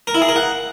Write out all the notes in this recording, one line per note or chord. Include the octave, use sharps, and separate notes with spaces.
A#4
E4
G#4
A#4
F#5